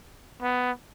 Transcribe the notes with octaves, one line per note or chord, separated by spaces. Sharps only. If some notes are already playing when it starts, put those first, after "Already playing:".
B3